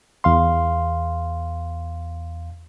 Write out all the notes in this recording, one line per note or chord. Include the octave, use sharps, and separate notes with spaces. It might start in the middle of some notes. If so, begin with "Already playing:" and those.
E2 F5 C6